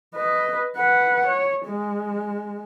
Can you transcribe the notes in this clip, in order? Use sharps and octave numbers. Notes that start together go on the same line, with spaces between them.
B4 D#5
B4 F#5
C#5
G#3